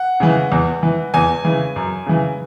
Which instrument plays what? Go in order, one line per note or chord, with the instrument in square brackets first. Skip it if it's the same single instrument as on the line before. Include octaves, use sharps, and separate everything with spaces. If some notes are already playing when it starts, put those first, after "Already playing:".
Already playing: [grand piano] F#5
C#3 E3
E2
E3
E2 G#5
C#3 E3
F#2
C#3 E3